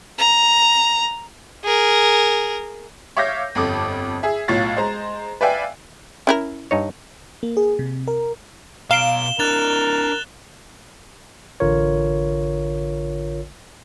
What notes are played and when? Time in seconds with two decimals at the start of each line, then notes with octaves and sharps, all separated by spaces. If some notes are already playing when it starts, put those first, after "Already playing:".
0.18 A#5
1.64 G#4 A#4
3.17 C#5 E5 F5 D6 G6 A#6
3.55 G1 F2 A4 D6
4.23 G#4 E5
4.48 B1 A2 F4 C#5 F5 A6
4.77 G#3 C5 A#5
5.41 B4 D5 E5 F5 G5 G#5
6.27 C#4 E4 A#4
6.71 G2 D#4 C#5
7.43 A#3
7.57 G#4
7.79 C3
8.08 A#4
8.91 B2 F5 A#5 D7 E7 G7
9.39 D4 E4 A#4 F#6 A6 F7
11.60 A1 D3 F4 A#4 C#5